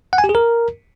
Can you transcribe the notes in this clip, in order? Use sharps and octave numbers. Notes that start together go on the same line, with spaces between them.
F#5
G#5
G4
G#4
A#4